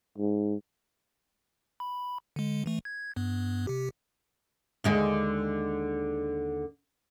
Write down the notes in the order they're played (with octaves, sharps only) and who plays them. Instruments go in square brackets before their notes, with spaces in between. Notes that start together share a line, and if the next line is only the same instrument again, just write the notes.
[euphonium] G#2
[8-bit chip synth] B5
D3 G#3
E3 A3
G#6
G2 B3
C3 G4
[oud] D#2 D3 G#3